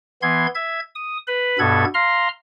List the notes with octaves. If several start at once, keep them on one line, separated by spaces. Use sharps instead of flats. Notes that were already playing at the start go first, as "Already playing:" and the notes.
E3 B3 C6 G#6
E5 G#6
D#6
B4 B5
G2 B2 B3 A4 G#6
F5 A#5 C6 F6